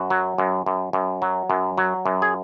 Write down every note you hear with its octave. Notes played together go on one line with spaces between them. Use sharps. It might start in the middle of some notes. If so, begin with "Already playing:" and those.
Already playing: F#2 F#4
F#3
F#2
F#2
F#2
F#3
F#2
F#3
F#2
G#4